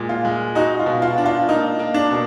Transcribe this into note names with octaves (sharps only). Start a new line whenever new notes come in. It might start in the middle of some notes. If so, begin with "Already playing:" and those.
Already playing: A#2 G#3
F4
G#3
D#4 F#4
F4
B2
F4
D4
F4
A#3 D#4
A#3
D4
B2